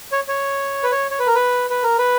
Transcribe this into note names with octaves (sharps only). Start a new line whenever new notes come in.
C#5
C#5
B4
C#5
C#5
B4
A#4
B4
B4
A#4
B4